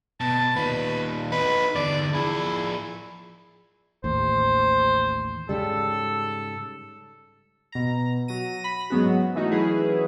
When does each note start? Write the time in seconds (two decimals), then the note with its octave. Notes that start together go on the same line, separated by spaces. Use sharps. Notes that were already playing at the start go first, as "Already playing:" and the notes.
0.20 B2 A5
0.56 A#2 D#3 B4
1.32 D#4 F#4 B4
1.75 E2 D3 D5
2.14 F3 E4 G#4
4.04 A1 D#2 C5
5.49 G#2 C#3 G3 A4
7.72 B2 A#5
8.28 F#3 A#6 D#7
8.64 B5
8.90 G#2 F#3 G#3 B3 C#4 F#4
9.35 E3 A3 C#4 D#4 F#4
9.51 E3 F#3 C#4 E4 G#4 B4